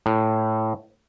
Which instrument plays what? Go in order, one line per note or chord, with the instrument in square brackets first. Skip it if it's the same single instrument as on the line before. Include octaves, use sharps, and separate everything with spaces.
[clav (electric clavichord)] A2